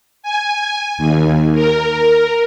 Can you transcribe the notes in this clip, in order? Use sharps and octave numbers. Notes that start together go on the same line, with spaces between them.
G#5
D#2
A#4